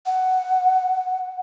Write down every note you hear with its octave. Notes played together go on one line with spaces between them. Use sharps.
F#5